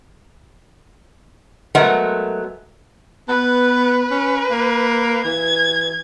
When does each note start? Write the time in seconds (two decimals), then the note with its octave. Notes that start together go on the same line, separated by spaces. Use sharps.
1.75 F#3 G#3 A3 B3 A#4 F#5
3.29 B3 B4
4.11 C#4
4.51 A#3
5.25 E3 G#6